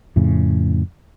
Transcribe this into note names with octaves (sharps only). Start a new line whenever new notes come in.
F2 A2 C#3